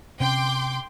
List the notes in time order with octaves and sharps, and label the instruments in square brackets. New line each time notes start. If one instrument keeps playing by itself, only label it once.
[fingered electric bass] C3 C4 C#4 [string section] G5 C6 D6